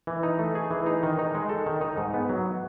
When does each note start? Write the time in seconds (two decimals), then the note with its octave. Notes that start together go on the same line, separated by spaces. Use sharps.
0.07 E3
0.23 D#4
0.39 A3
0.55 G#4
0.71 E3
0.86 D#4
1.03 D#3
1.19 D#4
1.35 G#3
1.49 A4
1.66 D#3
1.81 D#4
1.97 G#2
2.14 B3
2.29 F#3